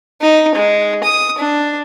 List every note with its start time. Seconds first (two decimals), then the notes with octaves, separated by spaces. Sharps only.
0.21 D#4
0.55 G#3
1.04 D#6
1.38 D4